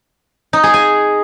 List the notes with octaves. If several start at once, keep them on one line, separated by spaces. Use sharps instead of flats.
D#4
G#4
G#5